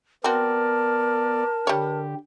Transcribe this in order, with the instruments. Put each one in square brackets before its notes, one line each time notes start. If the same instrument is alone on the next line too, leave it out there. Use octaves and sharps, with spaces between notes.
[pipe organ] B3 D5 [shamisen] C4 F#4 [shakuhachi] A#4 [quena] A5
[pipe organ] D3 G4 [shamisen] G3 C#5